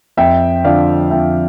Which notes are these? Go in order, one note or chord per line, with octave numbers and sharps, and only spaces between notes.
F2 E5 G5
D3 F3 D5 F5
F2 E5 G5